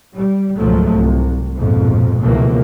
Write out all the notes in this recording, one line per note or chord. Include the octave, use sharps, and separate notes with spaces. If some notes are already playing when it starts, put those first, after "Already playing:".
G3
C#2 G#2 B2 F3 F#3 A3
C2
A#1 F2 G#2 B2 F3
C#2 B2 E3 F3 A3 A#3